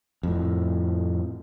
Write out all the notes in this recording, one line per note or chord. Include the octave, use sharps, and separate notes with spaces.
F2 A2